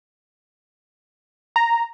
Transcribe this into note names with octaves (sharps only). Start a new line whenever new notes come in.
A#5